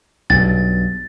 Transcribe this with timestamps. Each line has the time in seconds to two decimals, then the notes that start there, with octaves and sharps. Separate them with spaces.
0.30 B1 G2 A6